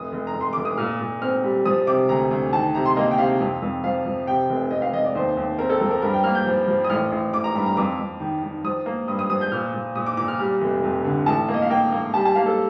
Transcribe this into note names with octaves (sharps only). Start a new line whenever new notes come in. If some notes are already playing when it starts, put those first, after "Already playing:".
Already playing: F1 D#6
F1
A#5
F1
C6
F1 D6
D#6
A#2 F6
A#2
C4 F6
G3
F3 D#6
C3 D6
D2 A#5
D2
D#3 A5
C3 A#5
C6
A#3 D#5
G5
C3 F5
F2
F2
F3 F5
F3
C3 G5
F1
F1 D#5
F5
F1 D#5
D5
D#2 C5
D#2
C4 A#4
A4
F3 A#4
A#4
G2 A#4
G5
A#3 F6
G6
F3
F3
D#6
A1 F6
A1
A1 D6
A#5
G2 A#5
A#5
F2 D6
F2
D#3
D#3
F3 D#6
A#3
G2 D#6
D#6
F3 D#6
G6
A#2 F6
A#2
A#2 D#6
D6
A#2 D6
F6
G3 F6
F1
F2
D3
A1 A5
A#3
D#5
F5
A#3 G5
A#3
G3 A5
A5
A#3 F5
A4